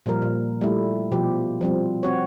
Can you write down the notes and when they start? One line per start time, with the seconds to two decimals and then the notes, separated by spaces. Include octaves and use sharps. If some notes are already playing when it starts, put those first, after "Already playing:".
0.06 A#2 F3 G3 A#4
0.22 A#2
0.61 G3 A3 E4
1.12 B2 F3 G4
1.61 F3 G3 C4
2.03 C4 F#4 C#5